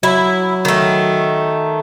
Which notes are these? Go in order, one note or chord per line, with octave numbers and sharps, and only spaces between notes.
F#3 E4
D#3 A3